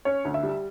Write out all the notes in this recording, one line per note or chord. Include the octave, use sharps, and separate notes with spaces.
C#4 C#5
D2
E5
G3